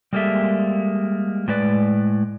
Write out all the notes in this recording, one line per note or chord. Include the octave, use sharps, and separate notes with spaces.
G3 G#3 A#3 G4 A4 E5
A2 G#3 B4 D5